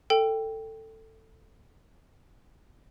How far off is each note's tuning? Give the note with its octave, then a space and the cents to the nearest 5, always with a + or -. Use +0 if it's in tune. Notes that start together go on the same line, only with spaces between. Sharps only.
A4 +15 G5 +0